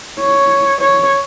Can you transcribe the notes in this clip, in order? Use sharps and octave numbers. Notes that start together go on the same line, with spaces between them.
C#5
C#5